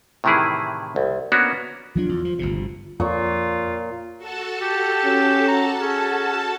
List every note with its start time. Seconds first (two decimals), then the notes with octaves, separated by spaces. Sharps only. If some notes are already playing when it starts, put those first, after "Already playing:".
0.24 A2 C3 D#3 E3 E4 G#4
0.96 C2
1.32 A#3 B3 C#4 D4 F#4 A#4
1.95 F3 F#3 D4 F4
2.09 E2
2.25 F3
2.39 G1 D2 C3
3.00 F2 A#2 F4 C#5
4.17 F#4 A4 A5
4.62 G4
5.05 C#4
5.48 A#5
5.81 C#4 G#4